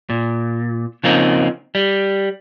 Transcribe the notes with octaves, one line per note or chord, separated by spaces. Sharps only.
A#2
C#3 F3 A#3 C4 C#4 D#4
G3